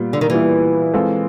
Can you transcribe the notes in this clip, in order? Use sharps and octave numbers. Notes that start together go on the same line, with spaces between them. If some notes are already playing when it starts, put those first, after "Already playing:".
Already playing: A#2 G3 B3
D3
D#3
A#2 E3 G3 B3 E4
G#3 C4 F4 A4